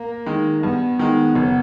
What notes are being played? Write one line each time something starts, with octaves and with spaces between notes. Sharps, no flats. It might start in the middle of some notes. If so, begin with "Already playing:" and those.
Already playing: A#3
D#3 G#3
G2 B3
D#3 G#3
F#1